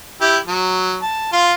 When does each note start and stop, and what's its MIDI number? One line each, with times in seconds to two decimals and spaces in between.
0.21 0.38 64
0.21 0.38 67
0.47 0.97 54
1.02 1.32 81
1.33 1.53 65
1.33 1.53 77
1.33 1.53 84